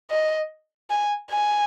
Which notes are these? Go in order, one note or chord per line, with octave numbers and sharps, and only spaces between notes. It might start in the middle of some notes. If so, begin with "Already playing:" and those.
D#5
G#5
G#5